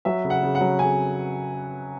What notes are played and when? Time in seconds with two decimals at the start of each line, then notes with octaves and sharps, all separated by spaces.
0.05 F#3 E5
0.24 C#3
0.30 F#5
0.43 C#3
0.55 F#5
0.60 F#3
0.79 C#3 G#5